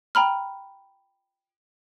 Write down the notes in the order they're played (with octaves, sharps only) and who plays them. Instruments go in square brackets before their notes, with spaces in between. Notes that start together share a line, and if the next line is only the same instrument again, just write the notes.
[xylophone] G5 A#5 B5 F6